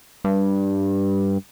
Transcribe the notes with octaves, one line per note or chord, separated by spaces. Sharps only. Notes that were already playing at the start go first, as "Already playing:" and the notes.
G2